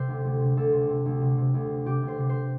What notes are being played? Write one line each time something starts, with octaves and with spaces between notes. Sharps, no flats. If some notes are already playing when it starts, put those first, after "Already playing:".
Already playing: C3 C5
D2
D2
C3
D2 A4
C3
C3
D2
C3
C3
D2
C3
C3 G4
D2
C5
C3
C5